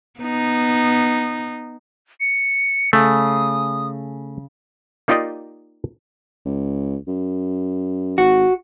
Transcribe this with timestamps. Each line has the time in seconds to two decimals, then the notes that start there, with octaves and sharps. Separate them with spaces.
0.20 B3 D#4
2.20 C#7
2.93 C#3 A3 D#6
5.08 A#3 D#4 F4 G4 D5 D#5
6.46 C#2
7.08 F#2
8.18 G#1 F#4